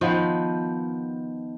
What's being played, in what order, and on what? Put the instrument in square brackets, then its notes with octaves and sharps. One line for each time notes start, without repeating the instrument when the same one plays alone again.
[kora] D#3 F3 B3